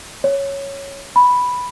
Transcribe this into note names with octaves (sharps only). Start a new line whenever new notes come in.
C#5
B5